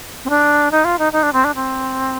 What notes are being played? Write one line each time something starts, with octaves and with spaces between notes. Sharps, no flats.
C4
D4
D#4
F4
D#4
D#4
D4
C4
D4
C4